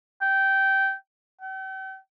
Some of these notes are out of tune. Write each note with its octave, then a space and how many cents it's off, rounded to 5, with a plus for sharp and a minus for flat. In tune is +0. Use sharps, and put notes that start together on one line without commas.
G5 -15
G5 -40